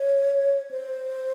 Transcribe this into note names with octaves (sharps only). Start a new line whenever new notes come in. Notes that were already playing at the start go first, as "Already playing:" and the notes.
Already playing: C#5
C5